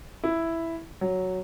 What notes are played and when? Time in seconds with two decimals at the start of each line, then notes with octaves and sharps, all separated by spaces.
0.24 E4
1.01 F#3